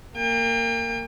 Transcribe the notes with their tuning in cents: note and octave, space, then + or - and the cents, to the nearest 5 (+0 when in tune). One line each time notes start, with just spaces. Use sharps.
A#3 -20 G5 +40